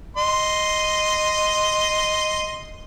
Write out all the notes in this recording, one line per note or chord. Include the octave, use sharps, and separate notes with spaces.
D#5 C6